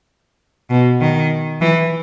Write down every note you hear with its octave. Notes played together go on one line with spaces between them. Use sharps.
B2
D#3
E3